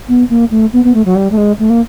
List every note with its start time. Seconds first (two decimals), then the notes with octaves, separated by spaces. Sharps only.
0.08 B3
0.29 A#3
0.50 A3
0.73 B3
0.84 B3
0.94 A3
1.05 F#3
1.15 G3
1.31 A3
1.37 G#3
1.59 A3
1.69 A#3